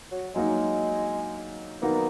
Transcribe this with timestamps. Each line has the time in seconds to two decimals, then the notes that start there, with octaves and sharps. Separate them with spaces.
0.11 F#3
0.35 F#3 G#3 A#3 D#4
1.82 D#3 F#3 A#3 B3 D#4